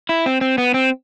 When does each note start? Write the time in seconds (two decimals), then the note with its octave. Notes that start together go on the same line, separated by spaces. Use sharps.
0.09 E4
0.26 C4
0.41 C4
0.58 B3
0.74 C4